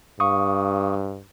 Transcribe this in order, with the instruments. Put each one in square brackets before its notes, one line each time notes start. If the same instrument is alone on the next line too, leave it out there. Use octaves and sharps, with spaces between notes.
[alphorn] G2 [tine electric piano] F5 C#6 D#6